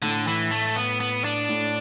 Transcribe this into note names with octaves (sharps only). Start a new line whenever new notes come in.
A2 D3
E3
A3
B3
B3
D4
A2